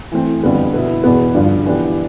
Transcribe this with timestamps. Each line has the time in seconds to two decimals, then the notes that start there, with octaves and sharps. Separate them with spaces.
0.12 E3 A3 C4
0.43 F2 D3 G3 B3
0.74 B2 B3 E4
1.04 E2 B2 B3
1.34 G2 D3 F3
1.66 E3 B3 D4 G4